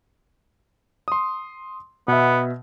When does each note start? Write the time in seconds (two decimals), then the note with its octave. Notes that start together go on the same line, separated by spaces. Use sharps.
1.08 C6 D#6
2.08 B2 B3 E5